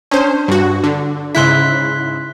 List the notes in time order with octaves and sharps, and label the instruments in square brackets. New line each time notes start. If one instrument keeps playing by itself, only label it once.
[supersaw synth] C#4 C5 [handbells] D4
[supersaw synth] G2 F#4
D3
[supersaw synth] G#2 C#3 E4 [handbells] C6 F#6 B6